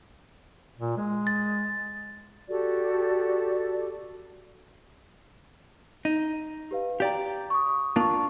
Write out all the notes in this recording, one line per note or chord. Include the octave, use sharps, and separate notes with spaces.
A#2
G#3
A6
F#4 G4 A4 D5
D#4 D#7
G4 B4 F5
G4 D5 F5 G5 A#5
C#6 D#6
A#3 D4 F4 A5 C#6